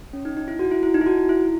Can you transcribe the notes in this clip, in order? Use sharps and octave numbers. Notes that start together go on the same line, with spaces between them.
C#4
D#4
D#4
E4
F#4
E4
E4
D#4
E4
F#4
E4